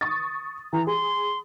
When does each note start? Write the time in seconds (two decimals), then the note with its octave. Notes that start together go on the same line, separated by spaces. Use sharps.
0.01 C#6 D#6 A6
0.73 E3 A#5
0.87 G#4 C6